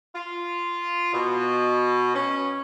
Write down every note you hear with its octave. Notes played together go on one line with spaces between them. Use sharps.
F4
B2
C#4